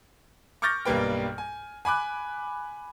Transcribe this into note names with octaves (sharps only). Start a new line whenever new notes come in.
C#6 D6 F6 G6 A6 A#6
B1 G2 G3 A#3 B4 G5
G#5
G#5 B5 D6 F#6